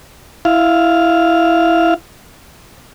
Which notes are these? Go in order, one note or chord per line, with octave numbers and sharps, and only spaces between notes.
E4 F5